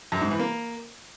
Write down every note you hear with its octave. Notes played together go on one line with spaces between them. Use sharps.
F#2
G#2
E3
A#3